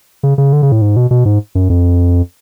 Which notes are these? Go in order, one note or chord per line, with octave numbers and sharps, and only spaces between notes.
C#3
C#3
D3
C#3
A2
G#2
B2
B2
G#2
F#2
F2